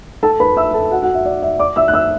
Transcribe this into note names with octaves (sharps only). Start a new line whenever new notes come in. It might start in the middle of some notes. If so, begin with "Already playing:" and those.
A4 A5
B4 B5
E5 E6
A4 A5
F#4 F#5
F#4 F#5
E5
D5
E5
D5 D6
E5 E6
F#6
E5 E6